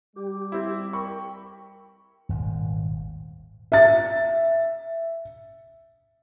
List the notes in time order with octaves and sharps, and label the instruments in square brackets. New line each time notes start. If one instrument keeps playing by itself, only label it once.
[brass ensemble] G3 [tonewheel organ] G4 [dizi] D6
[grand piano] C4 E4
[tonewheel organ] A#4 [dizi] G5 [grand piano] B5 C#6
[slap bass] D#1 G#1
[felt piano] E5 A6